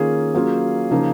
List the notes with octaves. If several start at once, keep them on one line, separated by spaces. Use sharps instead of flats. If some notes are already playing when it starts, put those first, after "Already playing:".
Already playing: D#3 A#3 C#4 F4 G#4
F#3 A#3 C#4 F4
C#3 F3 A#3 D#4